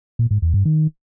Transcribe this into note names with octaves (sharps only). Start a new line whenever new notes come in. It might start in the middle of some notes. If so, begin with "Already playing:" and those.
A#2
G#2
E2
G2
D#3